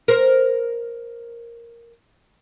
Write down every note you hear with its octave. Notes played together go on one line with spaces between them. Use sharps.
A#4 C5